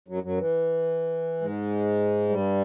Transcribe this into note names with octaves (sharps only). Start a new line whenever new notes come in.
F#2 F#3
F#2 F#3
E3
G#2 G#3
G2 G3